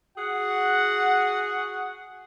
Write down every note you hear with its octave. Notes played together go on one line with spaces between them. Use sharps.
F#4 G#4 F#5